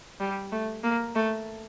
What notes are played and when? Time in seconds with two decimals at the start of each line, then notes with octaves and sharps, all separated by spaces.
0.20 G3
0.52 A3
0.83 A#3
1.15 A3